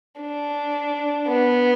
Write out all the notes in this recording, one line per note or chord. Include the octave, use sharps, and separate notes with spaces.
D4
B3